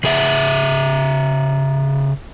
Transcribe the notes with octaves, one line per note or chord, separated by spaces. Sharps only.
C#3 G#4 E5 F#5